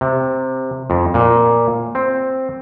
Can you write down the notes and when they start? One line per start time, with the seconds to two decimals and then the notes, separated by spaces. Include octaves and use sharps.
0.01 C3
0.90 F2
1.14 A#2
1.95 C4